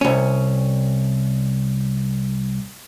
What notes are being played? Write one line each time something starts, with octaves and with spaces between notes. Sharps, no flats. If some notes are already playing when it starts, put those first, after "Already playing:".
C2 C#4